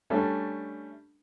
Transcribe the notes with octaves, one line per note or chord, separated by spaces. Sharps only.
G3 A3 C#4 D4